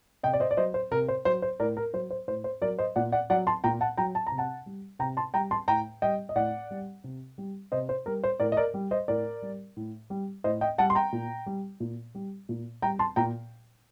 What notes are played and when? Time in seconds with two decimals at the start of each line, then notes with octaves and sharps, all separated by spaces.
0.23 C3 D#5 G5
0.33 D5
0.40 C5 D#5
0.51 D5
0.57 F#3 C5 D#5
0.74 C5
0.91 C3 A#4
1.08 C5
1.25 F#3 C5
1.42 C5
1.60 A2 A#4 D5
1.77 A#4
1.93 F#3 C5
2.10 C5
2.28 A2 C5
2.44 C5
2.61 F#3 A#4 D5
2.79 C5 D#5
2.96 A#2 D5 F#5
3.12 D5 F#5
3.30 F#3 D5 F#5
3.47 A5 C6
3.64 A#2 G5 A#5
3.81 F#5 A5
3.97 F#3 G5 A#5
4.15 A5
4.27 A#5
4.32 C3
4.38 F#5 A5
4.66 G3
4.99 C3 G5 A#5
5.17 A5 C6
5.34 G3 G5 A#5
5.51 A5 C6
5.68 A2 G5 A#5
6.02 G3 D#5 G5
6.29 D#5
6.36 A2 D5 F#5
6.71 G3
7.04 C3
7.38 G3
7.72 C3 C5 D#5
7.89 C5
8.06 G3 A#4
8.24 C5
8.40 A2 A#4 D5
8.52 D#5
8.57 A#4 D5
8.74 G3
8.91 C5 D#5
9.08 A2 A#4 D5
9.42 G3
9.77 A2
10.10 G3
10.44 A2 C5 D#5
10.61 D#5 G5
10.78 G3 F#5 A5
10.90 C6
10.95 G5 A#5
11.13 A#2
11.46 G3
11.80 A#2
12.15 G3
12.49 A#2
12.82 G3 G5 A#5
12.99 A5 C6
13.16 A#2 G5 A#5